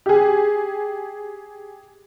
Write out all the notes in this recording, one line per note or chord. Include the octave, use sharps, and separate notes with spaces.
G4 G#4